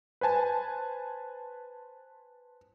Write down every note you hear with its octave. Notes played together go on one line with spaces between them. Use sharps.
B4 C5 G#5 A5